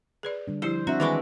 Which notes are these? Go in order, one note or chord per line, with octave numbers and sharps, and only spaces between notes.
G#4 B4 D5
D3 G3 D4
F3 E4 G4 C5
C4 D4 F#4 E5 A#5
D#3 E3 G#3 B5 C#6 D6